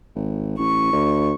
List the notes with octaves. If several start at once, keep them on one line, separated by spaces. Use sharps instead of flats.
G#1
A1 C#6
D2